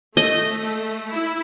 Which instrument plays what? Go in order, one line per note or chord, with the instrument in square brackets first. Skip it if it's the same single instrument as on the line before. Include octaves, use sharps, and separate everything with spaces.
[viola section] A3 [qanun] D#5
[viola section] E4